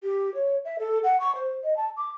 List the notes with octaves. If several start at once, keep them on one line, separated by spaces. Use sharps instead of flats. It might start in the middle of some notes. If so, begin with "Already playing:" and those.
G4
C#5
E5
A4
F#5
C#6
C5
D#5
A5
D6